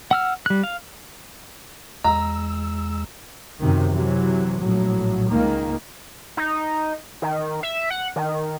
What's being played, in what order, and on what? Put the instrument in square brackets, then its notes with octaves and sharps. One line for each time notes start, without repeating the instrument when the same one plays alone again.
[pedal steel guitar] F#5 E6 F6
G3 F#6
F5
[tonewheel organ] E2 G#3 E6 [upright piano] A#5
[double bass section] F#2 C3 D#3
C3 E3 F#3
A#1 A2 F#3
C#2 D#3 A#3
[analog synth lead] D#4
D#3
E5
F#5
D#3